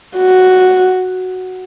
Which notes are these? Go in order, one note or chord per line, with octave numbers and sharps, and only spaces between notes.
F#4